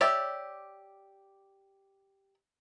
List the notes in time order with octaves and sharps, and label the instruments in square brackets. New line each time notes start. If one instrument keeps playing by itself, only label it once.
[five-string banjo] G4 C#5 D5 E5